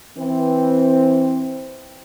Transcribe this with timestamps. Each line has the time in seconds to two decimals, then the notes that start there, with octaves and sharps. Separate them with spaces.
0.19 E3 C4